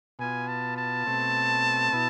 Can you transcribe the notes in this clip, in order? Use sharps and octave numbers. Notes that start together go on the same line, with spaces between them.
B2 B3 F4 G#5
A5
A5
B2 A3 C4
B2 B3 E4